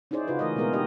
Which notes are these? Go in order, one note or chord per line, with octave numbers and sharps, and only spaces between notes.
C#4 D#4 E4 G#4 C5 D5
C#3 F4 F#4 B4
E3 A3 A#4 C5 D#5
B2 G#3 A#3 B3 G#4 A#4
D4 D#4 G4 D#5